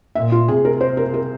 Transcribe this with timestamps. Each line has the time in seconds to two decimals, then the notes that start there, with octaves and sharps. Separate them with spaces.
0.15 A#2 E5
0.32 F4
0.48 C3 G#4
0.65 A#4
0.81 C5
0.97 A#4
1.14 A#4